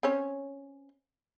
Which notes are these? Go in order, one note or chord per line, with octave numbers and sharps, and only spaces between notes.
C4 C#4 C#5